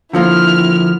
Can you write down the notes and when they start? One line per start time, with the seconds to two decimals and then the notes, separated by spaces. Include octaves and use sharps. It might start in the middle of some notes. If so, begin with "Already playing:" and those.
0.13 D3 F3 A#3 E4 F6